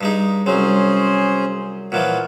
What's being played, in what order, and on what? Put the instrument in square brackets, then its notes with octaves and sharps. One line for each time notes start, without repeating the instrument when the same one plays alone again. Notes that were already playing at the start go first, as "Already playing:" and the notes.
[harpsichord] G2 G#3 D#4
[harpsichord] C2 F#3 [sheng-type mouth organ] C#4 G#4 C5
[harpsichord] A#2 E3 F3 [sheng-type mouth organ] F4 C#5 F#5